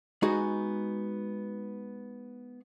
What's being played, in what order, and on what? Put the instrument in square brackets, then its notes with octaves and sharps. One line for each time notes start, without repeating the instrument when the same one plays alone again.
[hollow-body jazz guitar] G#3 B3 D#4 F#4 G#4